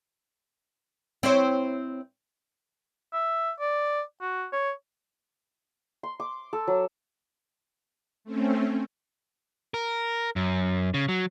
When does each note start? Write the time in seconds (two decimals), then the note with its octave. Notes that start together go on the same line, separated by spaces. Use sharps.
1.23 C4 E4 C#5
3.14 E5
3.60 D5
4.21 F#4
4.53 C#5
6.03 C6
6.20 D6
6.53 A4
6.68 F#3
8.24 A3 C4 C#4
9.74 A#4
10.36 F#2
10.94 C#3
11.09 F#3